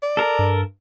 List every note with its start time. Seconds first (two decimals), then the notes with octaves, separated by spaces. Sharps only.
0.03 D5
0.17 A4 A#4
0.39 G2